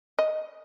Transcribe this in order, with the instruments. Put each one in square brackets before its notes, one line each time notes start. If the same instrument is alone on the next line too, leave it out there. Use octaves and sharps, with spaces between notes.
[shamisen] D#5